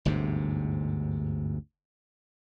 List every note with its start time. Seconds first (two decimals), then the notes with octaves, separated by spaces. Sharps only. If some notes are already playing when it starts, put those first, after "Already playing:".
0.05 G1 D2 G#2 C3